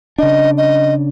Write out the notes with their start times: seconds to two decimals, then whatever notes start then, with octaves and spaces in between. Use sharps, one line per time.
0.18 C#3 D4 D#5
0.57 D#5